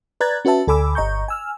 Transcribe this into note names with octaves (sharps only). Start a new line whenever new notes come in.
B4 D5 A#5 F#6 G#6 A6
C#4 F#4 B4 E5 A5
D2 A4 G#5 B5 D6 E6
G1 D#5 A#5 C#6 G6
G#5 E6 F6